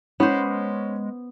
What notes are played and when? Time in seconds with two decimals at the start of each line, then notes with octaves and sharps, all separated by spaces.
0.20 G#3 B3 C#4 C5